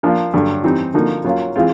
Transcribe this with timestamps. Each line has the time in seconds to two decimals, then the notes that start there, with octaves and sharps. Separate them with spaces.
0.03 F3 A#3 D4 F4
0.34 G2 D3 F#3
0.63 E3 G3 C4 D#4
0.94 D3 F3 A#3 D#4 F#4
1.25 F#3 A#3 C#4 F4
1.56 E3 G#3 C4 F4